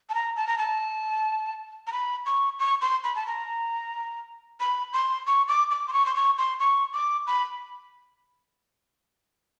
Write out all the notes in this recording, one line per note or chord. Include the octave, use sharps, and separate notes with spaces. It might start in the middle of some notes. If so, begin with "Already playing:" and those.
A5
A#5
A5
A#5
A5
A#5
B5
C#6
C#6
C6
B5
A5
A#5
B5
C6
C#6
D6
D6
C6
C#6
C6
C#6
C6
C#6
D6
B5